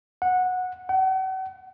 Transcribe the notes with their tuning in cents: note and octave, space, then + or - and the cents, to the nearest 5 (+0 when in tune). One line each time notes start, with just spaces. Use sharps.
F#5 -15
F#5 +40